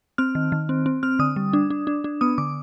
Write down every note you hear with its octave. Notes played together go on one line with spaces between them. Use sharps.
C4 F6
D#3
D#3
C4
C4
C4 F6
D3 D#6
G3
D4
D4
D4
D4
B3 D#6
D3 D6